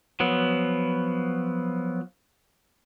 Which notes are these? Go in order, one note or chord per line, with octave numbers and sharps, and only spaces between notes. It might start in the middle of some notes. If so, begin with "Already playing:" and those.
F3 F#3 B3